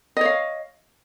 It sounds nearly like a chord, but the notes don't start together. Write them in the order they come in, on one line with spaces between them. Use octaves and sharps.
D#5 C#5 F5